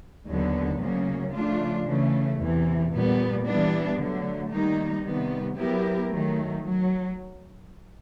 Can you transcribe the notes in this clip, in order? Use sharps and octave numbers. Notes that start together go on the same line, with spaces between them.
D#2 D3 F#3 B3
D2 C#3 F#3 A#3 C#4
C#3 F3 A3 D4 F4
C#3 E3 A3
E2 C3 E3
A#2 G3 B3
E3 G3 B3 D4
D3 F#3 A3
D#3 G3 A#3 D#4
C3 D#3 G3 B3
F#3 B3 E4 G4 A#4
D#3 F#3 A3
F#3